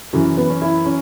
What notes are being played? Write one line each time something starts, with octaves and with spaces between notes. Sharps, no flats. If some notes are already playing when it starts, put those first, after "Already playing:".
F#2 E3 C#4
B3
C#4
E4
C#4